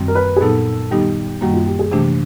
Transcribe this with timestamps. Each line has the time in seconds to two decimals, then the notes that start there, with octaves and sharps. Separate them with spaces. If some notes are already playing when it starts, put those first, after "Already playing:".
Already playing: F#2 D#3 G3 C4
0.08 A#4
0.15 B4
0.36 G#4
0.41 A#2 F#3 B3 D#4 A4
0.91 D#3 G3 B3 D#4 G4
1.41 F#2 D#3 G3 A#3 F#4
1.54 F4
1.66 G4
1.79 G#4
1.91 C3 E3 A3 D4 G4